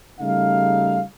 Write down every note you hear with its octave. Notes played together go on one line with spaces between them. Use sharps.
C#3 G3 A3 D#4 F5